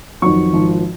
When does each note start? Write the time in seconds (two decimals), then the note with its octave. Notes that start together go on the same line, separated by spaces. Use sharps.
0.22 F2 D#3 F#3 C#6
0.53 G#1 G#2 F3